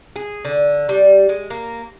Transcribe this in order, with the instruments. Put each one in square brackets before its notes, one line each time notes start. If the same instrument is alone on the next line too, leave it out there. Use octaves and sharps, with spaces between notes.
[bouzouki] G#4
D3
G3
G#3
A#3